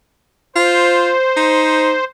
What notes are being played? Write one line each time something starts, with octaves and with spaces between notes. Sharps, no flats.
F4 C5
D#4